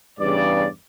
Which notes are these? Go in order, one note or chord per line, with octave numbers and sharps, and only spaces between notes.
E2 G2 C#3 D5